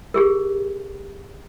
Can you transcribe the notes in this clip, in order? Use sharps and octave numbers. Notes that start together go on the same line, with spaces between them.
G4 G#4 A#4